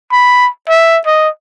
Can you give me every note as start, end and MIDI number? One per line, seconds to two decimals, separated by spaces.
0.12 0.48 83
0.69 0.99 76
1.06 1.29 75